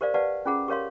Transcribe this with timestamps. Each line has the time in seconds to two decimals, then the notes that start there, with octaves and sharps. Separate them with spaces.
0.01 G4 A#4 C5 D5 F5
0.14 G4 B4 D5 F5 F#5 A5
0.46 C#4 F4 G#4 F#5 A#5
0.68 G4 A#4 C#5 F5 C6